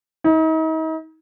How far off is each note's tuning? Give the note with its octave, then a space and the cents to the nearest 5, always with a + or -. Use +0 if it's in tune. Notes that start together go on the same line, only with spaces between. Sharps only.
D#4 +40